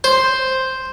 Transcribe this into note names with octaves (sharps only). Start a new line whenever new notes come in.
C5